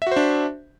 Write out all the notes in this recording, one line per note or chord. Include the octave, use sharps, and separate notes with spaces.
D4 F#4 C5 E5